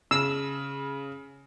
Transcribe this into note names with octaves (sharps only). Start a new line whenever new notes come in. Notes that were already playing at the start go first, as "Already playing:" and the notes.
C#3 E6